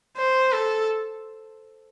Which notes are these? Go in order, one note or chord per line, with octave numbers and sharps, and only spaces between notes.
C5
A4